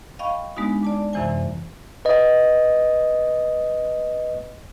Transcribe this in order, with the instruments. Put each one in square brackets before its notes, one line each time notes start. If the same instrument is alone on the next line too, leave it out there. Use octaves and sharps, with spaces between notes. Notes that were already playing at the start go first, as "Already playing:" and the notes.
[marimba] D#5 F5 G5 B5 C#6
G#3 B3 D4 D#4 F#4
D5 A5 D6
F#2 C3 E3 C5 G#5
[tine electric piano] B4 D#5